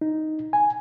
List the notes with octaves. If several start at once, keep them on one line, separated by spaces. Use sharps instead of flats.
D#4
G#5